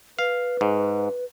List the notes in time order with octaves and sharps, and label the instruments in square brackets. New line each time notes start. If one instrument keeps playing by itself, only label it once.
[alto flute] B4 [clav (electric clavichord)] F5
[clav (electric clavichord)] G#2